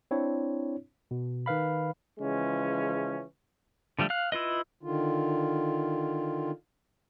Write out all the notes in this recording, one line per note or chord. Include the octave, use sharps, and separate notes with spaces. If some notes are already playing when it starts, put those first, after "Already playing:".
C4 D4 E4 C#5
B2
D#3 B4 F5 B5
C#3 E3 F3 G#3 C#4
D3 F3 G3 A3
F5 F#6
E4 F4 B4 D#5
D3 D#3 F4